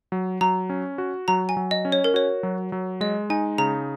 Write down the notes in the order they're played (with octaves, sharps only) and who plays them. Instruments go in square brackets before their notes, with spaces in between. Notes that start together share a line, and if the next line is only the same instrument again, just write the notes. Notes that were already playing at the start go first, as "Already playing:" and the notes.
[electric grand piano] F#3
[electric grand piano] F#3 [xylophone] A#5
[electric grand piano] C#4
F#4
[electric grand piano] F#3 [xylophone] A#5
[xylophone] G#5
[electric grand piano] F#3
[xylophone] D#5
[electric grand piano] C#4
[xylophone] C#5
A#4
[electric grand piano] F#4 [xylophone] C#5
[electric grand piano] F#3
F#3
[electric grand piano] G#3 [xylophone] D#5
[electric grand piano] D#4 [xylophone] G#5
[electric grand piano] C#3 [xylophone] A#5